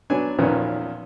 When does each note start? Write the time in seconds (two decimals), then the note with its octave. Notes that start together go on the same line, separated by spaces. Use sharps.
0.10 F#3 B3 D4 G#5
0.38 E2 A#2 D#3 F3 B3 C#4